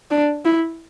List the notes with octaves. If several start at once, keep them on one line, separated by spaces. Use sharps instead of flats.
D4
E4